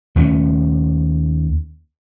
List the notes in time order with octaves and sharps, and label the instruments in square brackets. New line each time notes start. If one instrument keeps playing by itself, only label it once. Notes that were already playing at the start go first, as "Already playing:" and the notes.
[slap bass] D#2 A3 B3 C#4